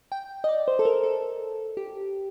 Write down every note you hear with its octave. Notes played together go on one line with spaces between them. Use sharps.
G5
D#5
D5
C5
A4
A#4
A4
G4